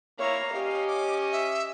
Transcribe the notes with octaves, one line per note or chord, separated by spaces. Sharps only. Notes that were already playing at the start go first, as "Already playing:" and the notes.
A#3 E4 C#5 F5 A#5
C#4 G4 D#5
D6
E5